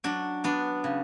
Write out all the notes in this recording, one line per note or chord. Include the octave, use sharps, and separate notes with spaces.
F#3 D4
B3 D4
C#3